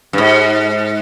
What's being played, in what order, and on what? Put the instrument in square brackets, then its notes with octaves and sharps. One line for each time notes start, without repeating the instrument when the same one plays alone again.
[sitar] G2
G#2